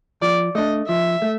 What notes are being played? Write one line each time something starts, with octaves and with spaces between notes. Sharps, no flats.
F3 D5
A3 D4 D#5
F3 E5
A3